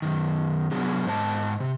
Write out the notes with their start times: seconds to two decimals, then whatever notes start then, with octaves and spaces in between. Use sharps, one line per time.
0.02 F#2 D#3
0.72 C3 F#3 B3 D4 G#4
1.07 G#2 C5 D#5 A5
1.60 C3